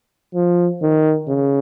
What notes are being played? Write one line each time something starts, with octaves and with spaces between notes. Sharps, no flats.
F3
D#3
C#3